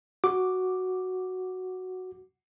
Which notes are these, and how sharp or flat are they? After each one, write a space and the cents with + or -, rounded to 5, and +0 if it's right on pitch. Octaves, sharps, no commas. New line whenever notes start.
F#4 +0 D6 +0